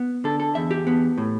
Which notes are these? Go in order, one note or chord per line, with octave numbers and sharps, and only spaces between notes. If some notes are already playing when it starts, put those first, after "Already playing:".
Already playing: B3
D3 A4
A4
E2 E5
G4
B3
A2